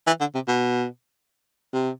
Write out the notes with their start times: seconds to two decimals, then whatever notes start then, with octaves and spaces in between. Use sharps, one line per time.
0.07 E3
0.20 D3
0.34 C3
0.47 B2
1.73 C3